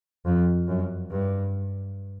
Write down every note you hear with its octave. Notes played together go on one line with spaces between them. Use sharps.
F2
F#2
G2